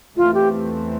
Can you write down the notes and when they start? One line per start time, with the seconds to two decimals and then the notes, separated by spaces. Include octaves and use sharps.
0.16 E2 E3 A3 C4 F4
0.34 G4